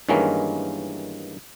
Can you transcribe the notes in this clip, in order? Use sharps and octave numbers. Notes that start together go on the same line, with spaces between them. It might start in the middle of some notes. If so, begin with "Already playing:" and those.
G2 D#3 E3 G#3 A#3 C#4